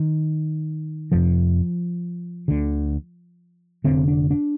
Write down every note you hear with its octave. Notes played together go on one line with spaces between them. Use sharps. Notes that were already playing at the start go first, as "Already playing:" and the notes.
Already playing: D#3
F1 F2 C3 F3
D2 D3
D#2 D3 C4
F1
D4
D4